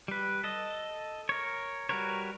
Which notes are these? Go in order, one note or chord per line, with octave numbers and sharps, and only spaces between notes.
G3 B4
A4 D#5
A#4 C#5
G3 F#4 A#4 B4 C#5